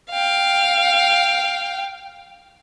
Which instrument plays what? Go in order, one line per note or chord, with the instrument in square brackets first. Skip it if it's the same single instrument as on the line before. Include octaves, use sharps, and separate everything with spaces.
[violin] F5 G5